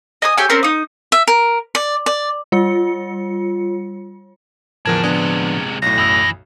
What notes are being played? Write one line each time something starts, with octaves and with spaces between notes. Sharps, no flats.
D#5 G#5 D#6
G4 A4 C#5 G#5
C4 C#4 A#4 C5
D#4 D#6
E5
A#4
D5
D5
G3 F4 C#7
E2 A2 D3 F3 D4 A#4 G#6
C3 G#3 B3 D4
B1 A2 A#6
F#2 E3 D#6 E6